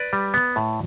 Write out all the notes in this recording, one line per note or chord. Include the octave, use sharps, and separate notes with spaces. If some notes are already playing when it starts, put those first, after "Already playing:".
Already playing: B4 D5
G3
B3
A2